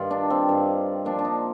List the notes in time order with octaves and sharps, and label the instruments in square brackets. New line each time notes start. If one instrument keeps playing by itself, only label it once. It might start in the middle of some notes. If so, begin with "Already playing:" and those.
Already playing: [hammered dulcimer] G2 D#3 F4
D4
C4
G2 D#3
A#2 F3 D4
D4
D#4